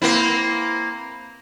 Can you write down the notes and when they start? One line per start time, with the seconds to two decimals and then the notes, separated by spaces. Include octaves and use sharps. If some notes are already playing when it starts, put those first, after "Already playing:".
0.02 A#3 C4 E4